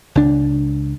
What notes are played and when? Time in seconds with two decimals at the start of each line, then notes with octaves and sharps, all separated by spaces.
0.15 C#2 D4